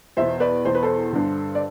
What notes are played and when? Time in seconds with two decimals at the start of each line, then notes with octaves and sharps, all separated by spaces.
0.17 E2 B2 C5 E5
0.40 B4 D5
0.65 E2 B2 C5
0.75 B4
0.83 A4 C5
1.13 G2 D3
1.55 D5